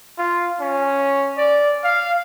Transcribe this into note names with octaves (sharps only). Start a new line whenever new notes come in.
F4
C#4
D5
F5